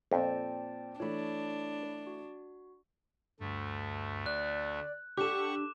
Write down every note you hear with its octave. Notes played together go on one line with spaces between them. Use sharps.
F2 A#2 C4 D5 G5 A5
E3 A3 D4 C#5 B5
F#4
D2 G2 A3
D5 F#6
D4 G4 A4 F#5 C#6 D6 E7